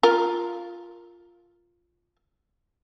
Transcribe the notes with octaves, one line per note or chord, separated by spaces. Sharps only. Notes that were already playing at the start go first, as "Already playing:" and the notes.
F4 A#4